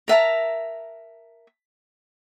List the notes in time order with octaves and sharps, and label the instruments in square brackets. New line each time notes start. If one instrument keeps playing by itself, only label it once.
[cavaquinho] A#4 E5 A5 A#5